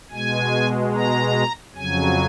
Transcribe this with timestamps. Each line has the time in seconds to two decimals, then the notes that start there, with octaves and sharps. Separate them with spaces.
0.11 B2 G#3 G#5
0.94 A#5
1.76 F2 C#3 F#3 G#5